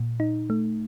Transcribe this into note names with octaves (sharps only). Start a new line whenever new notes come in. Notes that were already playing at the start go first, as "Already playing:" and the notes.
Already playing: A#2
D#4
A3